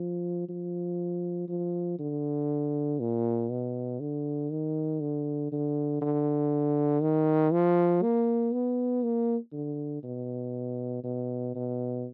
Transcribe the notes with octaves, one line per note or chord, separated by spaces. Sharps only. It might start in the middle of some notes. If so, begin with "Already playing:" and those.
Already playing: F3
F3
F3
D3
A#2
B2
D3
D#3
D3
D3
D3
D#3
F3
A#3
B3
A#3
D3
B2
B2
B2